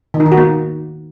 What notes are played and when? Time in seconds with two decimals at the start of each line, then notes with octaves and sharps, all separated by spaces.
0.14 D#3
0.20 D#4
0.26 D#3
0.32 F#4
0.38 A#3